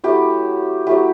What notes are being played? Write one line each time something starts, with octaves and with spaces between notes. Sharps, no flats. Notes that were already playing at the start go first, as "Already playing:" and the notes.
F#3 A3 E4 G4
F#3 A3 E4 G4